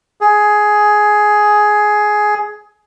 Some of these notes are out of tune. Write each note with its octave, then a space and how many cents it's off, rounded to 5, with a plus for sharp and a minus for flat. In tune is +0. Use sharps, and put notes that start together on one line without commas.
G#4 +10